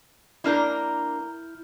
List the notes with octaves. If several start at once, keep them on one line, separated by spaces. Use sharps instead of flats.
A#3 D4 E4 A#4 F6 G6